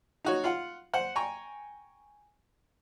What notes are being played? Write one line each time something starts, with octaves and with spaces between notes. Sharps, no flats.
D#4 F#4 C#5
F4 F#5
C5 F#5
G5 G#5 A#5 C#6